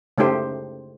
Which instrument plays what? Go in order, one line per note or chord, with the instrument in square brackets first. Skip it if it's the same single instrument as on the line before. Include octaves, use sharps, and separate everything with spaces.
[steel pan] C#3 A3 D#4 G4 C5